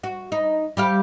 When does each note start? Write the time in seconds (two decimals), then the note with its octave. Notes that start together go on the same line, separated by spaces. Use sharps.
0.03 F#4
0.32 D#4
0.77 G3 G4 F5